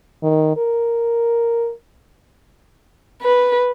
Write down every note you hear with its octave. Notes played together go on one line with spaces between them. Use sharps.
D#3
A#4
B4